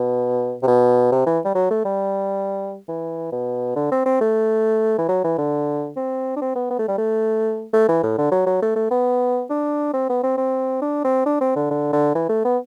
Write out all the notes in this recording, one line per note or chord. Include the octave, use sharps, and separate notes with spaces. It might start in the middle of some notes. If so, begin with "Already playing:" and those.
Already playing: B2
C3
B2
C3
E3
G3
F#3
A3
G3
E3
B2
D3
C4
C4
A3
E3
F#3
E3
D3
C4
D4
C4
B3
B3
A3
G3
A3
A3
E3
A2
D3
F#3
F#3
A3
A3
B3
D4
C4
B3
C4
C4
D4
C4
D4
C4
D3
D3
D3
E3
A3
B3